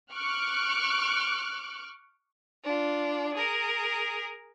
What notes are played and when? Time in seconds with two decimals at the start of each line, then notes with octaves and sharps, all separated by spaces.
0.12 C#6 D6 F6 F#6
2.63 D4 F4
3.33 G#4 A#4